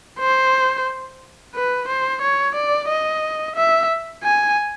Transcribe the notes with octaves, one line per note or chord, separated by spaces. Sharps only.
C5
B4
C5
C#5
D5
D#5
E5
G#5